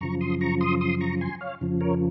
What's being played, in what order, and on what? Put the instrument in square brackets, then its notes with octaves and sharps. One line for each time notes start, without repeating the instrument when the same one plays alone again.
[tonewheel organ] F#2 C#3 F3 A#5 C#6
C6 D#6
A#5 C#6
C6 D#6
C6 D#6
A#5 C#6
G#5 C6
C#5 F5
F2 C#3 F3
A#4 C#5